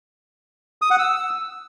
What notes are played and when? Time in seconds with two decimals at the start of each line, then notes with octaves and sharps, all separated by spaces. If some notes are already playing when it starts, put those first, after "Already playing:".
0.82 D#6
0.90 F#5
0.99 E6